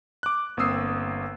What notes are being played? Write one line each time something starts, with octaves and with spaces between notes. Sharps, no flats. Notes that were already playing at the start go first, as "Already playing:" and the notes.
D6 F#6
G1 A#3 C4 D#6 E6 C7